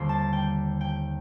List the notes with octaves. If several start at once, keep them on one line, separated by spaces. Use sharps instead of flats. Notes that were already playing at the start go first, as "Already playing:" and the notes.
Already playing: D#2 D3 G3 C5
A5
G5
G5